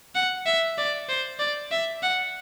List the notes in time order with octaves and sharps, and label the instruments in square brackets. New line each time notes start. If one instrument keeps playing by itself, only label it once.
[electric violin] F#5
E5
D5
C5
D5
E5
F#5